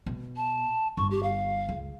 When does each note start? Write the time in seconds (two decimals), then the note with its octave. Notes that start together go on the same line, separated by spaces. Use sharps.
0.06 B2
0.37 A5
0.97 G1 C#6
1.11 G4
1.23 F5
1.69 C#2